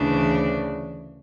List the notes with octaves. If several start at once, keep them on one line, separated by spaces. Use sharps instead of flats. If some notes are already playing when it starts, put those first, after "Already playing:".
Already playing: D2 C#3 E3 D4